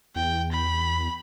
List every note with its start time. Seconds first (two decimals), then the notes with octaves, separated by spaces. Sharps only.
0.16 E2 G5
0.52 B5